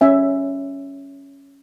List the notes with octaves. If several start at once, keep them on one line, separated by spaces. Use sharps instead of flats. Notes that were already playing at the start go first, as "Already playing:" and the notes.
C#4 E5 G#5